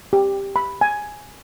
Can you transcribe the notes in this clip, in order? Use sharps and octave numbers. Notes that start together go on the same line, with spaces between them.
G4
B5
G#5